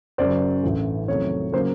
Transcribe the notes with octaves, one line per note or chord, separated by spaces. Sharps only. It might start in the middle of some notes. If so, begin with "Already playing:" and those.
F#1 F#2 C#3 F#3 C5 D5
A1 G2 E3 A3
F2 C3 D#3 F#3 A3 C#5
C#3 F#3 A#3 C5